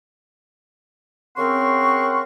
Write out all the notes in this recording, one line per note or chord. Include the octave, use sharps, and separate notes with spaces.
C#3 C4 A#4 F#5 C6 C#6